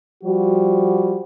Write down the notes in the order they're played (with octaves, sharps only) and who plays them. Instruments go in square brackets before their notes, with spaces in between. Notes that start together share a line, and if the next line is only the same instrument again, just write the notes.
[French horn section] F3 G3 F#4